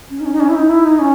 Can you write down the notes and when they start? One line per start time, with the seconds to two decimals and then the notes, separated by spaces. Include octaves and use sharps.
0.10 C#4
0.20 D#4
0.25 C#4
0.33 D#4
0.40 C#4
0.49 E4
0.55 D#4
0.69 E4
0.85 D#4
0.99 C#4